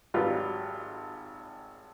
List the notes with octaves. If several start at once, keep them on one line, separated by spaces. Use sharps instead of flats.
G#1 F#3 G3 F4 B4